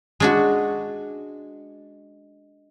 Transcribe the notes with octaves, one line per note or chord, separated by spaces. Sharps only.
G#3 D4 F#4